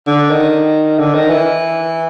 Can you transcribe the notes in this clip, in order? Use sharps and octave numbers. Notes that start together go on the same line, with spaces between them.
D3
D#3
D3
D#3
E3